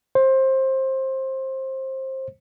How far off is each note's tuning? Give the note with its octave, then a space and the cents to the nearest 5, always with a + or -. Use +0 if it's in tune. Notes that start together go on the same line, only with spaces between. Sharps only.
C5 +20